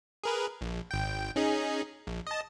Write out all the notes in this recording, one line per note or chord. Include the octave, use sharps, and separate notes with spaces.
G#4 A#4 B4
A#1
G#1 G5
C#4 D#4 G#4
A#1
D#5 A5